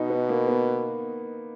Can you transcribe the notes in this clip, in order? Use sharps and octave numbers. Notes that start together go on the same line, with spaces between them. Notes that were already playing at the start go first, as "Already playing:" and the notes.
Already playing: B2 D#4
B3
A#3
B3